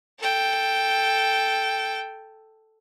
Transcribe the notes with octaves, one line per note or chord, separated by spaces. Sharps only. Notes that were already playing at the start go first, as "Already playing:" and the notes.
A4 G5